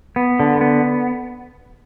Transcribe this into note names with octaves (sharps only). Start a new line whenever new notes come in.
B3
D3
B3